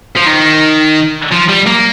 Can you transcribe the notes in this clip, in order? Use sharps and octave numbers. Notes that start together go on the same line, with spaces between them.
F3
D#3
F3
G3
A#3